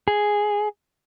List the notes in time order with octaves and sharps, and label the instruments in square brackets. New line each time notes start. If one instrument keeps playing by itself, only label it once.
[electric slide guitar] G#4